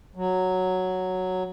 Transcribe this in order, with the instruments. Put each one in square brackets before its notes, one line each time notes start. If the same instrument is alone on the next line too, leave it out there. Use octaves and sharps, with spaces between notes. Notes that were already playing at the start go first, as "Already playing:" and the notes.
[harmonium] F#3